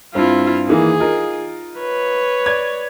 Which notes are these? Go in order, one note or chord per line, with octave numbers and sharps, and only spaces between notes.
G2 C4 E4 F4
D#3 E3 A#3 G#4
D#4 F4 A#4
B4 C#5
D5 G#6